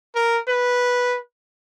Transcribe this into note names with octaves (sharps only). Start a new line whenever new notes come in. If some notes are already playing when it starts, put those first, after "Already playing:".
A#4
B4